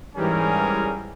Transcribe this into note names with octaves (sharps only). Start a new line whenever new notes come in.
G#2 E3 G3 C#4 G#4 A#4